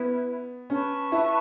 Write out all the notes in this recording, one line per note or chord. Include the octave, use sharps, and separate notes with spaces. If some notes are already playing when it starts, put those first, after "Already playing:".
Already playing: B3 C#4 E4 B4
C#4 B4 A5 C#6
E4